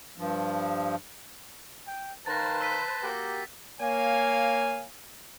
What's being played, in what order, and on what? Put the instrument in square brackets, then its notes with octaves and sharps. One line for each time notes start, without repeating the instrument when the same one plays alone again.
[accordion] G2 F3
[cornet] G5
[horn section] D#3 F5 A#5 [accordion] B4 C5 [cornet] A5 [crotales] A6 A#6
[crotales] E6 B6 D#7
[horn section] A#3 F#4 G4
[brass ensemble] A#3 C#5 F5 G#5